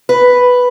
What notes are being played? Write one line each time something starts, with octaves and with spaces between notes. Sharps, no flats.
B4